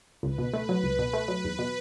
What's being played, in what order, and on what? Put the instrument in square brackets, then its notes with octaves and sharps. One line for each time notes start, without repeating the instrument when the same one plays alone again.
[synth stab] C#2 [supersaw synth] B4
[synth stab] B2
A3
F#3
C#2
B2
A3
F#3
E2
B2